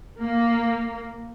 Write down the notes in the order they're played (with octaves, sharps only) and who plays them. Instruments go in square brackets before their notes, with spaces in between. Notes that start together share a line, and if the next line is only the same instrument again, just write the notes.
[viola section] A#3